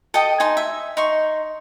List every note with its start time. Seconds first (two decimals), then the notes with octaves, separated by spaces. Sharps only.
0.14 A4 D#5 G5 D#6
0.40 D#4 G#5 C6
0.57 E5
0.97 D#4 C6 C#6